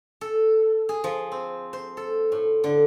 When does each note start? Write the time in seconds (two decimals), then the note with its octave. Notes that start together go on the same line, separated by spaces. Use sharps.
0.21 A4
0.89 G#4
1.04 F3
1.32 C4
1.73 C5
1.97 A4
2.32 A2
2.64 D3